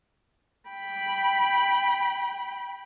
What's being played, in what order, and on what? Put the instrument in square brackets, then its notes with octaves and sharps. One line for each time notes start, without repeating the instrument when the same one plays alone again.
[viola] G5 B5